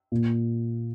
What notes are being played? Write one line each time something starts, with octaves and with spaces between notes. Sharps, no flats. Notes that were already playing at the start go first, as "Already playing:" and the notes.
A#2